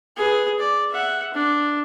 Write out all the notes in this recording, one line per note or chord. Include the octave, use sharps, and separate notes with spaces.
G#4 B4
D5
E5 F#5
D4